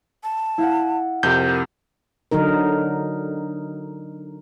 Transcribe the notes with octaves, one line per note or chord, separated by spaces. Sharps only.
A5
E4 F5 F#5
F2 C3 A#4 G6
D3 F#3 D#4 A#4